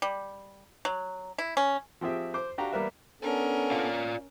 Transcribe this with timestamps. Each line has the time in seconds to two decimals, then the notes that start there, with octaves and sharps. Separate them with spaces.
0.02 G3
0.85 F#3
1.38 E4
1.57 C#4
2.01 F3 C4 G4 G#4 E5
2.34 C5 D6
2.58 D4 F#4 G4 F5 A#5
2.72 G3 A#3 B3 A#4 B4 E5
3.22 B3 C#4 D4 A4 A#4
3.71 F4 D5 F5